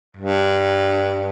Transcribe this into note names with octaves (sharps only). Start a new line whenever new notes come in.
G2